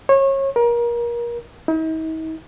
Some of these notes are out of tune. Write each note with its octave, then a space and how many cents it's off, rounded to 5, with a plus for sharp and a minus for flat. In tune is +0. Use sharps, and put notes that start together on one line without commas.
C#5 -25
A#4 +30
D#4 +45